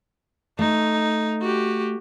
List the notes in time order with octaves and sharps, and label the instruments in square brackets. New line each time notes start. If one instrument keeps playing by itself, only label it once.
[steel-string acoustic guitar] A3 [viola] D#4
[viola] F#4 G4